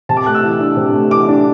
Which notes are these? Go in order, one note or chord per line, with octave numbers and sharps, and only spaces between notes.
C3 A5
D6
A3 F#6
E6
E3
D4
C3
A3
E3 D6
D4